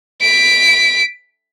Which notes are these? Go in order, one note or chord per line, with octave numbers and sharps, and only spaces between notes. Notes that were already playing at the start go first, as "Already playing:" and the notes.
B6 D7